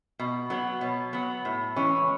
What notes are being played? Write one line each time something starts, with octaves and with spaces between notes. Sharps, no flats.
B2
F#3 B3
B2
F#3 B3
A2
E3 G#3 C#4